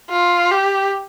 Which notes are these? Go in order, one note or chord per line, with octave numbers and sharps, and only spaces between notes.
F4
G4